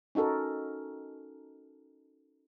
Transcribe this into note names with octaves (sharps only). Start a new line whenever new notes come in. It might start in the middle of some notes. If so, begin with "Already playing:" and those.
C#4 D#4 F#4 A4 A#4